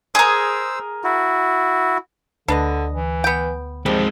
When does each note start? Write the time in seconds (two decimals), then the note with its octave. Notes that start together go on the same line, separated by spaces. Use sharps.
0.15 G#4 A#4 C5 E6
1.04 E4 F#4
2.48 D2 D3 D4 B4 D#5
2.92 E3
3.24 B3 G5
3.86 F3 G3 G#3 C4